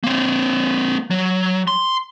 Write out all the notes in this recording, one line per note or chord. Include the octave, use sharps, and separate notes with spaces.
A#3 C4
F#3
C6